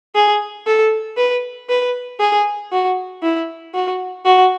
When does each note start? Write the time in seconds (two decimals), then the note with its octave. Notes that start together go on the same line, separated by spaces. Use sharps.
0.15 G#4
0.67 A4
1.17 B4
1.69 B4
2.21 G#4
2.72 F#4
3.23 E4
3.74 F#4
4.25 F#4